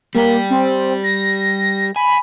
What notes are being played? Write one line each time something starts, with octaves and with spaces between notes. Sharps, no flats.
G3 A#3 G4
C4
A#6
G#5 B5